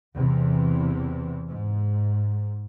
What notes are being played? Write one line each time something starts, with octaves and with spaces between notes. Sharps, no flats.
E2 C3 E3
G#2